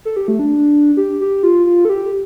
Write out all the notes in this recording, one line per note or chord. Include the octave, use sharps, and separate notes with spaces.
A4
G4
A3
D4
G4
G4
F4
F4
A4
G4